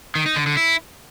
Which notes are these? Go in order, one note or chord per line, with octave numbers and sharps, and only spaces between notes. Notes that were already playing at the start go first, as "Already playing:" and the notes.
D#3
D#4
D3
D3
E4